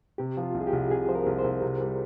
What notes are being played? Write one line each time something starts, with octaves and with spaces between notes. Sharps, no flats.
C3 G4
F3
F4
C2
G#4
G4
C2
C3 G#4
F3 C5
A#4
C2
C5
C2
C3
G3